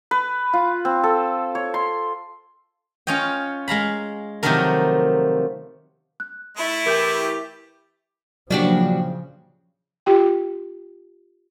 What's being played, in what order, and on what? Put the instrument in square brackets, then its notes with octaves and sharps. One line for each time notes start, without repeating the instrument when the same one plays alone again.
[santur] B4
F4
C4
A4
C#5
C6
[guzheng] C#4 F4 C#5 D#5 G5
G#3 F5 A#5 B5
C3 D#3 F3 F#3 A3 A#4
[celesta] F#6
[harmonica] A3 [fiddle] E4
[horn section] E3 G4 [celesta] A#4 G6
[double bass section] A#2 C#3 F3 [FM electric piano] F#3 A#3 [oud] D4 F#4 G4
[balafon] F4 G4 G5